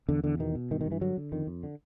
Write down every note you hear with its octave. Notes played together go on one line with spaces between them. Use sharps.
E2 D3
E2 D3
B2 D#3
B2
G2 D#3
D#3
G2
E3
D3 F#3
D3
F2 D#3
F2
D3